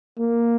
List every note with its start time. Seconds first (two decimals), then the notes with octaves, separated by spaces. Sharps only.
0.20 A#3